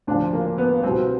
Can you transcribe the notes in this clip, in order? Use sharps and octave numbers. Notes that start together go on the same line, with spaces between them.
D2 C#3 F3 D4
A#3
B3
C2 B2 C4